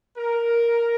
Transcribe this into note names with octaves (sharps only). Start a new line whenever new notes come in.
A#4